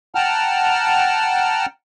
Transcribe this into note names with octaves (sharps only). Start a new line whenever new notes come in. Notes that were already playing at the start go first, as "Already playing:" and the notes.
F#5 G5 A5 A#5 F6